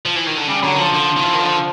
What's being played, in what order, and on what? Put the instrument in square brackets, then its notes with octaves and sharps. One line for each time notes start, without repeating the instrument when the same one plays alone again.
[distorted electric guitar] F3
E3
D#3
D3
[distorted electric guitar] C#3 [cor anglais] G3
[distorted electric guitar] D3 [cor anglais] F#3
[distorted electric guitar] D#3
[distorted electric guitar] D3 [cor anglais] F3
[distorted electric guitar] D3
D#3
E3
D#3
D3